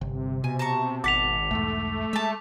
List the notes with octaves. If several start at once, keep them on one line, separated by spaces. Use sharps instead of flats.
G1 C3
B2 G#5
A5 A#5 C#6
G#1 F#5 A5 D6 B6 F7
B1 E2 G#2 A3
G#3 E5 A5